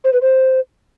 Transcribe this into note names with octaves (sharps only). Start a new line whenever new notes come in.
C5
B4
C5